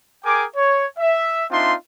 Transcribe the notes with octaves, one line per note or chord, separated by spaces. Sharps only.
G#4 A#4 G5 G#5 D6
C#5
E5
C4 D4 D#4 F4 E5 C6